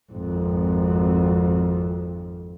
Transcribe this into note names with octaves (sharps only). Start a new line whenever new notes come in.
G#1 F2